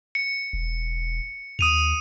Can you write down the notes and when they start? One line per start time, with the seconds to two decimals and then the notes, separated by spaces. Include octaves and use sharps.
0.15 C#7
0.53 E1
1.59 D#2 D#6 D#7 F7